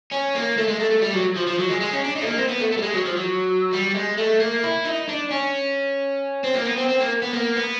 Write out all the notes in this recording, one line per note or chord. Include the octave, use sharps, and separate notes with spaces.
C#4
A#3
A3
G#3
A3
A3
G3
F#3
F3
F3
F#3
G#3
G#3
C#4
D4
D#4
A3
A#3
C4
B3
A3
A3
G3
G#3
F#3
F3
F#3
G3
G#3
A3
A#3
E4
D#4
D4
C#4
C4
A#3
B3
C4
C4
A#3
B3
A#3
B3